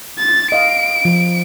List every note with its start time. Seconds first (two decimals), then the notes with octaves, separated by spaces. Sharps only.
0.19 A6
0.52 D#5 F5 D7
1.05 F3